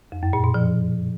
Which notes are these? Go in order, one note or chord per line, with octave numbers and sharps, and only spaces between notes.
F2
F#2
A#2
B2
F3